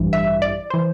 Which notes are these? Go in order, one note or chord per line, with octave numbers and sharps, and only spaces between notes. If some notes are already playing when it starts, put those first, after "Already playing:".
Already playing: A1 G2 E3
E5
D5
E3 C5